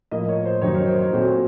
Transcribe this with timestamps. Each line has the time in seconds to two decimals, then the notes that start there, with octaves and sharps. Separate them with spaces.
0.11 A2 F3 A#3 D#5
0.29 C#5
0.46 C5
0.62 F#2 D#3 F#3 A#3 D#4 C#5
0.75 A#4
0.87 C5
1.00 C#5
1.13 A#2 A3 C4 F#4 C5